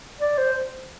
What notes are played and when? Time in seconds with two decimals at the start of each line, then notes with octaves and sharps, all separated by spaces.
0.21 D5
0.38 C5